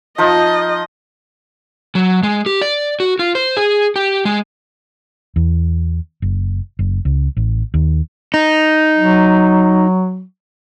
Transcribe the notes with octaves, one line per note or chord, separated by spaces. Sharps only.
F3 D#4 F4 D#5
F#3
G#3
G4
D5
F#4
F4
C5
G#4
G4
G#3
E2
F#1
F#1
C#2
A1
D#2
D#4
F#3